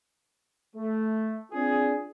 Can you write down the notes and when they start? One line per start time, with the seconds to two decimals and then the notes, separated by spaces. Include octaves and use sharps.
0.75 A3
1.52 C4 D4 F4 G#4